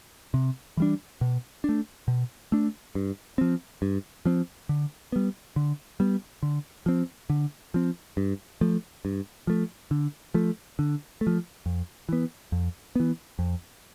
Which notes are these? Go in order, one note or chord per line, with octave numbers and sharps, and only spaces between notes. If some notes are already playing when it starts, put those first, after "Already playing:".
C3
E3 G3 D4
B2
A3 D4
B2
A3 D4
G2
F3 C4
G2
F3 C4
D3
G3 B3
D3
G3 B3
D3
F3 C4
D3
F3 C4
G2
F3 A3
G2
F3 A3
D3
F3 A3
D3
A3
F3
F2
E3 B3
F2
E3 B3
F2